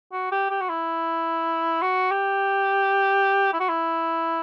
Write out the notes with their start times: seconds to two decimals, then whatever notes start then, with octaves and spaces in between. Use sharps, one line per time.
0.12 F#4
0.32 G4
0.51 G4
0.61 F#4
0.69 E4
1.82 F#4
2.11 G4
3.53 E4
3.60 F#4
3.69 E4